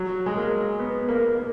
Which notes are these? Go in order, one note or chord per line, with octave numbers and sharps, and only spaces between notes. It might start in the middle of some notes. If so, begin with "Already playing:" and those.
Already playing: F#3
G#3
A#3
B3
A#3
A#3